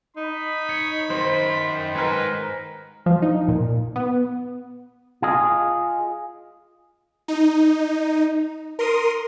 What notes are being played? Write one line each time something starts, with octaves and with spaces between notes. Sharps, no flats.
D#4 B5
C#5
F#2 D#3 C5
G#2 A#4 B4 G#5
F3
D#4
A#2
B3
F4 G#4 D#5
D#4
A#4 C6 D#6